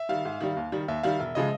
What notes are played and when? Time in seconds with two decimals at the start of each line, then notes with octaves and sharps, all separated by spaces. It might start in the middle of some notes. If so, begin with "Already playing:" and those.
Already playing: E5
0.09 D#3 G3 F5
0.25 G#2
0.40 D#3 G3
0.57 D#2
0.72 D#3 G3
0.88 D#2 E5
1.03 D#3 G3 F5
1.20 E1 E5
1.35 C#3 F3 G#3 D#5